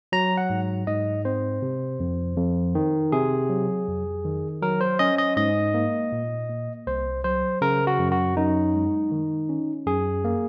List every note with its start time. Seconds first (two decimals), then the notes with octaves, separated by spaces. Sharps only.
0.12 F#3 A#5
0.37 F#5
0.50 G#2
0.87 G#2 D#5
1.25 C4 C5
1.62 C3
2.00 F2
2.37 F2
2.75 D#3
3.12 C3 G#4
3.50 F#3
3.88 F2
4.25 D#3
4.62 F#3 A#4
4.81 C5
4.99 C#4 D#5
5.18 D#5
5.37 G#2 D#5
5.74 A#3
6.12 A#2
6.50 A#3
6.87 C2 C5
7.24 F#3 C5
7.61 C#3 A#4
7.87 F#4
7.99 F#2
8.12 F#4
8.37 F#2 D#4
8.74 G#3
9.11 D#3
9.49 C#4
9.87 F#2 G#4
10.24 A#3